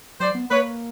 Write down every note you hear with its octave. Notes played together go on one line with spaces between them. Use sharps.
F#3 C5 D5
B3
A#3 B4 C#5